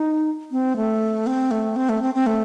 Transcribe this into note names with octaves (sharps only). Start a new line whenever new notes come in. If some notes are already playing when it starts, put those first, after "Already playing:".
Already playing: D#4
C4
A3
C4
A3
C4
A3
C4
C4
A3